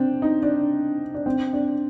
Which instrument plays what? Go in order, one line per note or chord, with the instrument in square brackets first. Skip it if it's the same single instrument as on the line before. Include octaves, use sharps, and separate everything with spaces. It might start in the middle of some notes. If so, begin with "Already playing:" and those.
Already playing: [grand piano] C4 D4
D#4
D4
D4
C4
D4